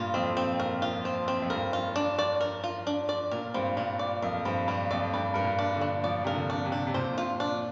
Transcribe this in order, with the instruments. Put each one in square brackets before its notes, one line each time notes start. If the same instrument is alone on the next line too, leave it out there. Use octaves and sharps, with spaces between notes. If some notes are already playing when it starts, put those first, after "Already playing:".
Already playing: [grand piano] G2 A#2 [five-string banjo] F4
[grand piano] F2 [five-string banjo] C4
[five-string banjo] C4
A#4
F4
C4
C4
[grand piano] F2
[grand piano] G2 [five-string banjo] A#4
[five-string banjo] F4
D4
D5
A#4
F4
D4
D5
[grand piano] A#2 [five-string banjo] A#4
[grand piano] G2 [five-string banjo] C4
[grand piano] A#2 [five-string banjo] G3
[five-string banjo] D5
[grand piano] F2 [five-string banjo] A#4
[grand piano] G2 [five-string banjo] C4
[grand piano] G2 [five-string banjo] G3
[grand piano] F2 [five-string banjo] D5
[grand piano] G2 [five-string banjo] D5
[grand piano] G2 [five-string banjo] A#4
[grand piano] A#2
[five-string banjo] D4
[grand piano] D3
[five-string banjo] D4
[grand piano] F3 [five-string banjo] D5
[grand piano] C3 [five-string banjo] A#4
[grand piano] D3
[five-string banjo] D4
[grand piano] C3
[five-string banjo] D4
[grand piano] C3
[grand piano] A#2 [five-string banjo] C5
[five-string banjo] F4
D4